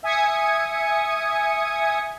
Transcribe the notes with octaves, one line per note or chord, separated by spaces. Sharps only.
E5 G#5 D#6 G#6 C#7